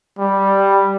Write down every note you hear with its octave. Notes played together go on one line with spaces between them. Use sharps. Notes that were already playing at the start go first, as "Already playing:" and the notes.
G3